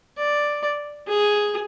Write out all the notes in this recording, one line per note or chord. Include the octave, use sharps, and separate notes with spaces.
D5
G#4